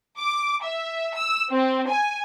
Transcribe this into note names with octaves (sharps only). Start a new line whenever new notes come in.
D6
E5
E6
C4
G#5